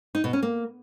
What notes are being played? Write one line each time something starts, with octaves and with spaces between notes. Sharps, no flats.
D#4
B2
C#4
A#3